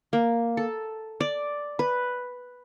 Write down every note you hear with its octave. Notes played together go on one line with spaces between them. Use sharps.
A#3
A4
D5
B4